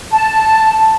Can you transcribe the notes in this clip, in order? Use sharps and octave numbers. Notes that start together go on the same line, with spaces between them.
A5